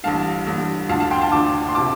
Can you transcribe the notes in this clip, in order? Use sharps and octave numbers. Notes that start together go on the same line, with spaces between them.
A1 G2 D3 F5 A5
A1 G2 D3
D2 D3 F5 A5
F5 A5
G5 C6
F5 A5
D2 D3 A5 D6
C6
C3 A5 D6